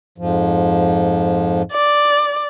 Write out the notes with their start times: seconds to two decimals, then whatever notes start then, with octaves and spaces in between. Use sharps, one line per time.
0.18 F2 G#2 F3
1.72 D5